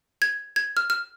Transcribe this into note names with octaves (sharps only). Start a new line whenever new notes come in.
G#6
G#6
F6
F6